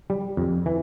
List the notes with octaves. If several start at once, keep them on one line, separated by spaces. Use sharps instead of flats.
G3
F2
E3